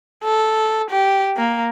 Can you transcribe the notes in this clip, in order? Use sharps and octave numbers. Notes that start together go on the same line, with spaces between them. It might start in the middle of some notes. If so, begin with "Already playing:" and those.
A4
G4
A#3